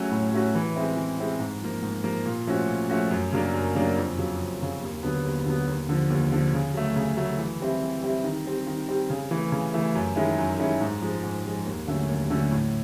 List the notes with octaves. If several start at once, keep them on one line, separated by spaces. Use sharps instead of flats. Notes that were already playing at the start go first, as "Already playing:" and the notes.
Already playing: F#3 A3 C#4 F#4
A2
F#3 A3 C#4 F#4
E3
G#3 C4 E4
E3
G#3 C4 E4
G#2
F3 A#3
G#2
F3 A#3
A#2
F3 A3 C#4 F#4
A#2
F3 A3 C#4 F#4
F#2
C#3 F#3 A#3 D4
F#2
C#3 F#3 A#3 D4
F2
C#3 F#3
F2
C#3 F#3
D#2
D3 F#3 B3
D#2
D3 F#3 B3
D#2
D3 F3
D#2
D3 F3
C#3
F#3 A3
C#3
F#3 A3
E3
G3 C4 E4
E3
G3 C4 E4
D#3
G3 C4
D#3
G3 C4
C#3
E3 A3
C#3
E3 A3
F#2
D#3 G#3 C#4 E4
F#2
D#3 G#3 C#4 E4
G#2
F3 G#3
G#2
F3 G#3
D#2
D3 F#3 A3 C#4
D#2
D3 F#3 A3 C#4
A2